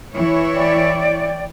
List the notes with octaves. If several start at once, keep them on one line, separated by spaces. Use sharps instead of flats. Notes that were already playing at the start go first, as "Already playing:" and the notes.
E3 E4 C#5
D5 G5